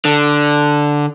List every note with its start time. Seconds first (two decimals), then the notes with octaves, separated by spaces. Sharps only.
0.05 D3